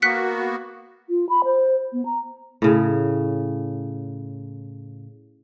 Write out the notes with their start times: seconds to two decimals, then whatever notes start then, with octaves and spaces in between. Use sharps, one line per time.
0.02 A#3 B3 F#4 F#6 B6 C#7
1.10 F4
1.29 B5
1.45 C5
1.93 B3
2.06 A#5
2.62 A2 C#3